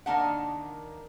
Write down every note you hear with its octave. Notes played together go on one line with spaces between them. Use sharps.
D#3 A#3 D4 F#5